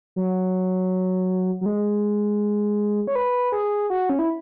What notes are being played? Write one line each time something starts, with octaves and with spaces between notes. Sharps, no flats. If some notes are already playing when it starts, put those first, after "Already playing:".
F#3
F#3
G#3
C#5
B4
G#4
F#4
C#4
E4